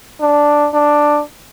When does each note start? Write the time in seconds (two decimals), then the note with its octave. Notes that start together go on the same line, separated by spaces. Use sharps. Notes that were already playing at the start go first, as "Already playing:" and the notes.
0.21 D4
0.74 D4